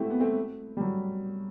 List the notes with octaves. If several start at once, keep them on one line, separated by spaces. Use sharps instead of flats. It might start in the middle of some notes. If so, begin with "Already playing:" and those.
Already playing: A3 C4 E4 F#4 G4
B3
A3 C4
G3
F#3